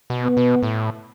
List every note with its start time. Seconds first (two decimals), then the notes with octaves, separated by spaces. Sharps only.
0.10 B2
0.23 B3
0.37 B2
0.63 A2